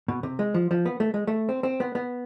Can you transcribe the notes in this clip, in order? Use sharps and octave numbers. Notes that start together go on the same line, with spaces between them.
B2
C3
G#3
F3
F3
B3
A3
G#3
A3
C4
C4
B3
B3